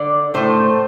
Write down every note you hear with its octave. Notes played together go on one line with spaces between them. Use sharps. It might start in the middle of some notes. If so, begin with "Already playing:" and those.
Already playing: D3 D5
A2 A3 C5